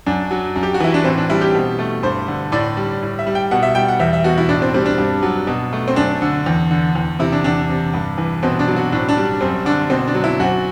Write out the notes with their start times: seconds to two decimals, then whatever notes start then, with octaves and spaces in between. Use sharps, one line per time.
0.06 F#2 D4
0.31 F#3
0.56 F#2
0.63 G4
0.74 F#4
0.80 E3 E4
0.94 D4
1.04 A2 C4
1.18 D4
1.30 G3 E4
1.41 G4
1.55 B2
1.79 A3
2.03 G2 C5
2.28 D3
2.52 A2 D5
2.77 G3
3.02 A2
3.19 E5
3.26 G3
3.35 G5
3.51 B2 F#5
3.63 E5
3.75 G3 G5
3.88 F#5
4.00 E2 E5
4.13 E5
4.24 B2 F#4
4.38 E4
4.49 A2 D4
4.62 C4
4.74 G3 C4
4.86 D4
4.98 G2
5.23 F#3
5.47 B2
5.73 A3
5.88 C4
5.96 F#2 D4
6.22 D3
6.46 E2
6.71 D3
6.95 E2
7.19 C3 E4
7.32 D4
7.44 E2 D4
7.70 C3
7.94 G2
8.18 E3
8.43 B2 C4
8.59 D4
8.68 F#3
8.76 F#4
8.92 A2 D4
9.09 D4
9.17 G3
9.41 F#2 C4
9.65 D3 D4
9.90 B2 C4
10.07 D4
10.14 F#3
10.24 E4
10.40 F#2 F#4